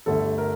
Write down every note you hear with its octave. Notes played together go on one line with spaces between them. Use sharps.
G1 G2 D3 A3 A4
A#4